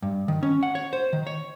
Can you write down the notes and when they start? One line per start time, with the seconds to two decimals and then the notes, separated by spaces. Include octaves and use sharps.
0.02 G2
0.28 D#3
0.43 C#4
0.63 F#5
0.75 C#5
0.93 C5
1.13 D#3
1.27 C#5